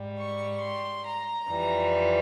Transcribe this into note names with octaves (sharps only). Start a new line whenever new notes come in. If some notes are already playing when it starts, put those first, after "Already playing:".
Already playing: G#2 G3
C#6
C6
A#5
F2 E3 G3